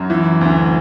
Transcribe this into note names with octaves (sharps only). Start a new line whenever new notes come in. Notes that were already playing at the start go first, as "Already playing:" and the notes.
Already playing: F#2 F#3
E3
D2